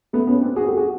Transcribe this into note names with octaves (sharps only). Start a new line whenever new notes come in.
A3 B3
B3 C#4
C4 D4
F#4 G#4
G4 A4
F#4 G#4